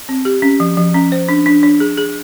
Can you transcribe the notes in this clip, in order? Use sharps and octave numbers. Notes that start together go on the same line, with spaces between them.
C4
G4
C#4
F3
F3
C#4
C5
D4
D4
D4
G#4
G#4